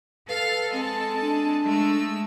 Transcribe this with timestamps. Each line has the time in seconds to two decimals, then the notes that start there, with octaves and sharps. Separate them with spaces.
0.29 A4 B4 F5 F6
0.73 G#3 C4 A5
1.21 D4
1.64 G#3 A3 E6